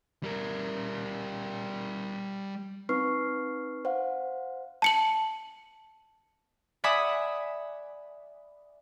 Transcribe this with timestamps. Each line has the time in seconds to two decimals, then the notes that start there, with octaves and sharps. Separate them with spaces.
0.23 G3 A#4
2.89 C4 D#4 B4 C#6 F6 C7
3.85 C5 F5 F#5
4.82 A5 C#7 F#7
6.84 D5 E5 F#5 G#5 B5 D#6